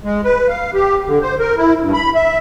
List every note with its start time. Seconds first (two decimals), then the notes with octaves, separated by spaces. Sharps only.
0.04 G#3
0.24 B4
0.49 F5
0.74 G4
1.06 D3
1.22 C5
1.39 A#4
1.57 E4
1.80 G2
1.94 B5
2.15 E5